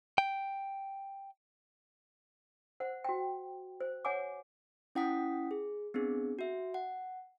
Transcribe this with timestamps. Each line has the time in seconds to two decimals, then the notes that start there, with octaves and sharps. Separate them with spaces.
0.18 G5
2.80 C5 F#5
3.04 F#4 G5
3.81 C5
4.05 C#5 F#5 G#5 D6
4.95 C#4 E4 F#5 G5 D#6 B6
5.51 G#4
5.94 B3 C4 D4 G#4
6.39 F#4 E5
6.74 F#5